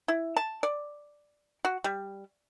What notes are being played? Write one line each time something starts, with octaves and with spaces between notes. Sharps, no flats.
E4
A5
D5
F#4
G3